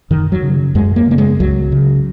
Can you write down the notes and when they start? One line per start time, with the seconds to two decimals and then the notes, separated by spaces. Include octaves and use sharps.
0.10 F#2 D#3
0.32 F#3
0.43 C#3
0.75 F#2 G#3
0.96 A#3
1.08 C#3 A#3
1.18 G#3
1.40 C#2 F#3
1.72 C#3